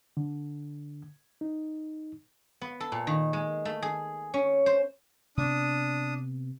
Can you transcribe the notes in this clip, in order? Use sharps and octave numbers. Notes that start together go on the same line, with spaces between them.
D3
D#4
B3
A4
A#2
D#3
G#3
A3
G#4
C#4
C5
C3 B3 D4 D#6